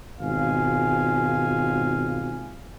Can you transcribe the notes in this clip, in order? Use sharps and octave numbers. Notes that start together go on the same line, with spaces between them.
G#1 B2 F4 F5 G#5